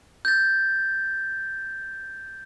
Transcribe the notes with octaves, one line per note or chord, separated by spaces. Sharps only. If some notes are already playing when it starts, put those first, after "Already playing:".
G6 A6